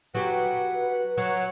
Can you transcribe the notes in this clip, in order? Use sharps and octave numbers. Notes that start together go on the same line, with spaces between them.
F#3 G4 B4 F#5
F#3 C#5 F#5